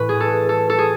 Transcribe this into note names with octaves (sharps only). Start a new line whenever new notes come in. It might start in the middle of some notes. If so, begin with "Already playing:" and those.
Already playing: A2 E3 B4
G#4
A4
A4
A4
G#4